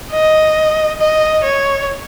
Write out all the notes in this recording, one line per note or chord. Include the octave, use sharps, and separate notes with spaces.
D#5
D#5
C#5